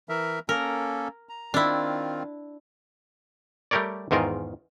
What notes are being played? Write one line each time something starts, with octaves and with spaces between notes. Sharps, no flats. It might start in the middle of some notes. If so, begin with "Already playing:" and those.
E3 A#4 E5
A#3 C#4 A4 A#4
A#5
D#3 C4 D4 E4 F4
G3 A3 G4 A#4 C#5 D5
E2 G#2 D#3 F4 A#4